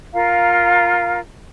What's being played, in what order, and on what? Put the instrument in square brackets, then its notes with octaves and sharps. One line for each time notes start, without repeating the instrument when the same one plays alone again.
[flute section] F4 A#4 F5 A#5